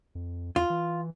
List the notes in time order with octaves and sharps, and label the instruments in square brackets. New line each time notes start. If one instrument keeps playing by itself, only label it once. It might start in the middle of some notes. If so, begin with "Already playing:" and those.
[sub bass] F2
[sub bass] E2 [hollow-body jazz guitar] F4
[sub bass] E3